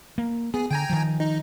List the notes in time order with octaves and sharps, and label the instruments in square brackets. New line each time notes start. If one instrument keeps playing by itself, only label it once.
[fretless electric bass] A#3
[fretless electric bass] B3 [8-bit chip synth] G#4
[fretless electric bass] D3 [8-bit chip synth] G5 G#5 A#5
[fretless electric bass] D#3 F3
[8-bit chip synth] D#4